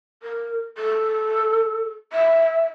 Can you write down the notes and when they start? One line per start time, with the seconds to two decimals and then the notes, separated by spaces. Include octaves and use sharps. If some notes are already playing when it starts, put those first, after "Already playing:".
0.23 A#4
0.78 A4
2.13 E5